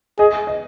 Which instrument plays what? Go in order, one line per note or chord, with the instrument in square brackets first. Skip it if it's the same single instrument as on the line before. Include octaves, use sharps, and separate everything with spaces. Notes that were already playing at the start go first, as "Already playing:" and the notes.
[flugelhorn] G#4 [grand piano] D#5
[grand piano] D#5